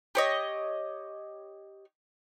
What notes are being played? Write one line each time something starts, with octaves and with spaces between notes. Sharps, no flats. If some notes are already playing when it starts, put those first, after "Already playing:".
G4 C#5 D#5